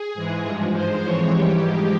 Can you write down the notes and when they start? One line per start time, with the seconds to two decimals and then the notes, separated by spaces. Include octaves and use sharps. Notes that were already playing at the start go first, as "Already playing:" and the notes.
Already playing: G#4
0.15 G#2 E3 G#3
0.44 G2 F3 G#3
0.73 G#2 F3 G#3 C5
1.03 F2 E3 G#3 C#5
1.33 G#2 E3 G3 G4
1.62 G#2 F3 G#3 G4